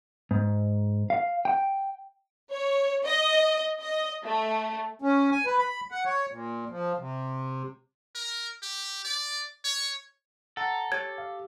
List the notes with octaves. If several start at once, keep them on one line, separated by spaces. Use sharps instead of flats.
G#2
F5
G5
C#5
D#5
D#5
A3
C#4
G#5
B4
B5
F#5
C#5
A#2
F3
C3
A#4
G4
D5
C#5
A4 F#5 A#5
G4 C#5 G#6
F5